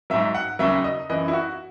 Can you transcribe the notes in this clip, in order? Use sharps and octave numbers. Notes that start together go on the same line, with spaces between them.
G#2 F#3 E5
F#5
D#2 C#3 F#3 E5
D#5
F#2 E3 D#5
E4
F#4